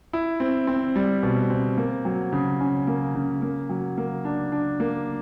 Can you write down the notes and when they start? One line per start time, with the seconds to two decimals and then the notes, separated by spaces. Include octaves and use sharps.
0.13 E4
0.40 C4
0.67 C4
0.96 G3
1.23 B2
1.50 C4
1.77 A#3
2.05 F#3
2.33 C#3
2.60 C#4
2.87 A#3
3.15 C#3
3.42 A#3
3.69 F#3
3.98 A#3
4.25 D4
4.52 D4
4.80 A#3